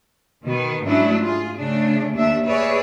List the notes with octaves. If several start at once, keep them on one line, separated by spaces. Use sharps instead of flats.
B2 D#3 B3
G#2 F#3 A3 C#4 D4 E4
F4 G#4
C#3 A3 D4
D#2 D4 E5
G#4 B4 C#5 D5 E5